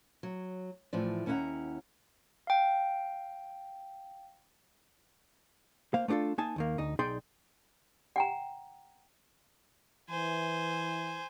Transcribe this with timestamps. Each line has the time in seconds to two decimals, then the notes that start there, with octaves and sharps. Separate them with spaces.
0.23 F#3
0.93 A2 E3 F3 D5
1.26 D#2 C#4 E4 C#5 F#5 A#5
2.47 F5 G5
5.94 A#3 C5 F5
6.08 A3 B3 D4 F4 A4
6.38 A#3 D#4 G#5 A5
6.56 D#2 D#3 A#3
6.78 D2 D#4
6.99 B1 D#4 G#4 D5 G5 C6
8.16 F#5 G5 A#5
10.10 E3 C5 G#5